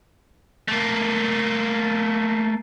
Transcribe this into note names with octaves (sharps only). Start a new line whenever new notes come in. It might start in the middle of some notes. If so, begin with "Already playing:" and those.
A3 A#3